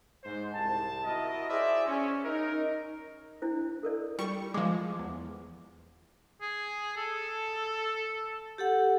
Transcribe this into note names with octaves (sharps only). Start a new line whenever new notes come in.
G#2 C5
C2 A5
E4 F#4 A#4 D#5
G#4 C5 D5 E5
C#4
D#4 A#4
D4 E4 C5
A4 A#4 D5
G3 F4 C#6
F3 G#3 D6
E2
G#4
A4
G4 A4 F#5